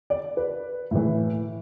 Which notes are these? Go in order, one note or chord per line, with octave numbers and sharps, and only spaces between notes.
D5
B4
A2 E3